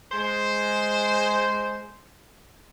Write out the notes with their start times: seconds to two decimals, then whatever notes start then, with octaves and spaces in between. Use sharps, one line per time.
0.12 G#3 C5